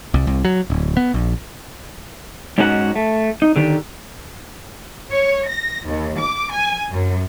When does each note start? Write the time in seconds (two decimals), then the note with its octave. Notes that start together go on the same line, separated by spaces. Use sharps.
0.14 C2
0.27 C2
0.45 F#3
0.70 D1
0.97 B3
1.14 A#1
2.58 G#2 C#4 D#4 F#4 G#4 F#5
2.96 A3
3.42 D#4
3.56 D3 D#3 G4
5.10 C#5
5.49 A#6
5.86 D#2
6.20 D6
6.54 G#5
6.92 F#2